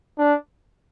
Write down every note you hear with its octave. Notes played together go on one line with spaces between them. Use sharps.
D4